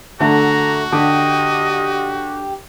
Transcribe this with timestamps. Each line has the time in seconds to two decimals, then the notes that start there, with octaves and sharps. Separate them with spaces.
0.20 D3 A3 F#4 A#5
0.92 D3 G4 D#5